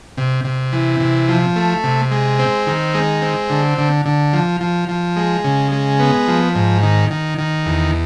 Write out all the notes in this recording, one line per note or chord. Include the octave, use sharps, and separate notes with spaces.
C3
C3
E3
C3
F3
A3
C3
G#3
C4
D#3
G#3
C4
D3
D3
D3
F3
F3
F3
G#3
C#3
G#3
B3
F3
G#2
D#3
D#3
D#3
E2